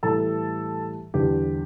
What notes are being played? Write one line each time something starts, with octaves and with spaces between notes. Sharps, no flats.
A2 E3 G3 A4 A5
E2 D3 G3 G4 G5